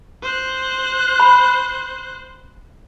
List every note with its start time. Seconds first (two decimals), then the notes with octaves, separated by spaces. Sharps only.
0.23 C5 F#6
1.20 B5